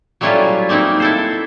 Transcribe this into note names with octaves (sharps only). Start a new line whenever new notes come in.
F#3 G3 A3 C#4 E4 F4
A#3 C4 D#4 E4
E4 A4 C5